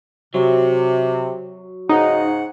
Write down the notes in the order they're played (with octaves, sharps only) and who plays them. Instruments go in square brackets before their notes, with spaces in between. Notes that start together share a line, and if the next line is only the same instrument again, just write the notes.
[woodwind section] C3 [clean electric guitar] F#3
[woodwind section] G#2 C#3 F#5 [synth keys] D#4